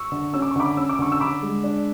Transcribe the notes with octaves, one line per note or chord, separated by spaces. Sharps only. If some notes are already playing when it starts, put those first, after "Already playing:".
Already playing: C#6 E6
D3
C#4 E6
D6
C#6
D3 B5 D6
C#4 E6
D6
D3 C#6 E6
E6
D3 B5 D6
G#3
D4